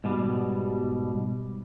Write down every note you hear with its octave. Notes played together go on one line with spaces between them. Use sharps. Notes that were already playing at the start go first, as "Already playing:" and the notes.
G#2 B2 G3